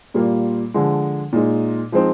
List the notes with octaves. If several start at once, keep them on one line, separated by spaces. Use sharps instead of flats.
A#2 G3 A#3 F4
D3 F3 G#3
A#2 G#3 D#4
F3 G#3 C4 D#4